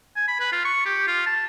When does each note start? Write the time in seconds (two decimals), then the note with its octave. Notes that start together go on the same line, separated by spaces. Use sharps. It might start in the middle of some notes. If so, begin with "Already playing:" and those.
0.16 G#5
0.28 B5
0.40 B4
0.52 F4
0.65 C#6
0.86 G4
1.07 F4
1.26 A5